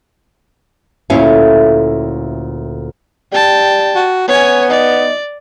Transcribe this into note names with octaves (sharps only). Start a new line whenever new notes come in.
D2 A#2 A3 C#4 E4 F5
G3 G5 A5
F#4
B3 C#4 C#5 G#5
D#4 D5